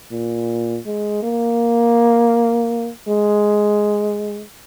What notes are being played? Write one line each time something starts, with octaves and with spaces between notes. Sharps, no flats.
A#2
G#3
A#3
G#3